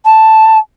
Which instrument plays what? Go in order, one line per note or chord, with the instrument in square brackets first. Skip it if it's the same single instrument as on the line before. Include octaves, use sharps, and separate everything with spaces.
[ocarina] A5